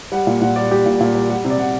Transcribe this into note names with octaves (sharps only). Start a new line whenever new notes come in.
G3 F#5
A#2
A#2 F#5
G3 D5
G3 G4
A#2
A#2
G3
G3 F#5
C3
D5
C3 F#5